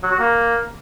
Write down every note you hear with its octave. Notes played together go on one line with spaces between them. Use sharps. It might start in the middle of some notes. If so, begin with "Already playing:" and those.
F#3
F#4
A#3